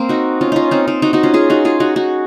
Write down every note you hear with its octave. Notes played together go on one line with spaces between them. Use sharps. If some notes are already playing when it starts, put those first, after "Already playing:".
Already playing: A#3 C4
D#4 F#4
C#4 F4
C#4 D#4 F4
C4 D#4
C4 D#4
D#4 F#4
D#4 F#4
C#4 F4
F4 G#4
D#4 F#4
F4 G#4
D#4 F#4
D#4 F#4